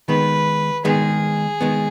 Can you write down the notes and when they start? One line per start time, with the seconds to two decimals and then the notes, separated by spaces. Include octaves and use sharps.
0.08 D#3 G#3 B3 B4
0.85 D#3 G#3 B3 G#4
1.61 D#3 G#3 B3